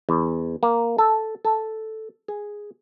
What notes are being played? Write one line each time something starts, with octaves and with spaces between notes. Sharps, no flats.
E2
A#3
A4
A4
G#4